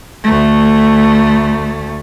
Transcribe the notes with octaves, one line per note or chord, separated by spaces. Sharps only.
D2 A3